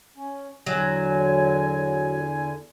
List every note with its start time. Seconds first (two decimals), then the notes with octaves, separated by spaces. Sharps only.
0.16 C#4
0.67 E2 D3 F#3 G#5